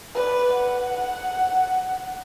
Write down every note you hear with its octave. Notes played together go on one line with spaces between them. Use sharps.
B4 D5
F#5